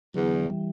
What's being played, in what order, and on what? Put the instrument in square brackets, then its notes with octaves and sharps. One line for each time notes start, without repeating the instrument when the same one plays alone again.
[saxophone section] E2 [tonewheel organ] D3 F#3
[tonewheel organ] E3 G3